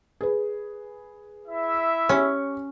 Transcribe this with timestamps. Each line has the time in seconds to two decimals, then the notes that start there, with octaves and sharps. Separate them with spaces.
0.21 G#4 B4
1.46 E4 E5
2.09 C#4 G4 C#6